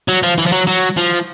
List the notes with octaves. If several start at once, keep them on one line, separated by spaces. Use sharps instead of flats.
F#3
F3
E3
F3
F#3
F#3
F3